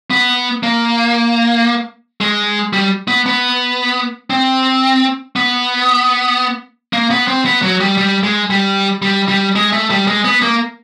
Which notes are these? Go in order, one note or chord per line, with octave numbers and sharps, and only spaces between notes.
B3
A#3
G#3
G3
B3
B3
C4
B3
A#3
B3
C4
B3
F#3
G3
G3
G#3
G3
G3
G3
G#3
A3
G3
G#3
B3
A#3